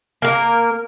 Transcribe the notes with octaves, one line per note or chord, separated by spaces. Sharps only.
A#3 A#4